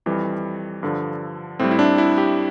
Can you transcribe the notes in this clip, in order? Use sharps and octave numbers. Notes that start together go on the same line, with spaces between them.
F2 E3 G3
G2 D3 F3
A2 G3 C4
E4
D4
E4
G4